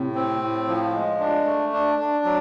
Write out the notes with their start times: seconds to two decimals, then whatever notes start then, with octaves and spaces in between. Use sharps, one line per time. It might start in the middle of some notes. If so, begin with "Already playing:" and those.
Already playing: A2 C3
0.15 C4
0.41 A2
0.68 F3
0.94 G#3
1.20 D4
1.46 A3
1.72 D4
1.99 D4
2.25 F#3